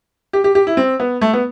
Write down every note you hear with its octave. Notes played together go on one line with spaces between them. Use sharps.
G4
G4
G4
E4
C4
B3
A3
B3